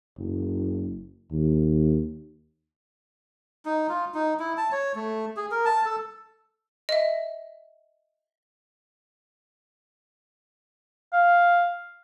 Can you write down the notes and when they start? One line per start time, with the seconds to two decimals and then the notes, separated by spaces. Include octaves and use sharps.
0.18 F#1
1.32 D#2
3.65 D#4
3.89 F4
4.14 D#4
4.39 E4
4.57 A5
4.72 C#5
4.95 A3
5.37 G#4
5.51 A#4
5.65 A5
5.85 A4
6.89 D#5 E5
11.13 F5